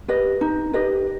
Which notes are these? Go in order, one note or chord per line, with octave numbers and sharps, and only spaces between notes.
G4 B4 D#5
D#4
G4 B4 D#5